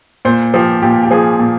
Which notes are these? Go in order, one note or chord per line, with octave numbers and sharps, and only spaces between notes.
A#2 C5
F3 G4
A#2 G4
G4
F3 G#4
A#2